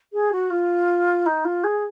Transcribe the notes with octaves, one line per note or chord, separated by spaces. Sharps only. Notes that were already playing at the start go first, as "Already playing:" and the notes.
G#4
F#4
F4
D#4
F4
G#4